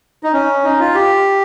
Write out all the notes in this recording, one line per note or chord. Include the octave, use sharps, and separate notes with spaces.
D#4
C#4
D#4
F4
G4